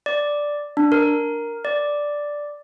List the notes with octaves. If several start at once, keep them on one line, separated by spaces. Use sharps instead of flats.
D5
D4
A#4
D5